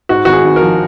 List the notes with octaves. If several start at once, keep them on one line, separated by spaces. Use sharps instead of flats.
G#2 F#4
G#1 F#4
G#4
G#1
F3 A#4